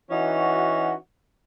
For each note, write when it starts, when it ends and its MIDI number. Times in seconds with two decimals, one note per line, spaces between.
0.11 0.94 52
0.11 0.94 61
0.11 0.94 63
0.11 0.94 66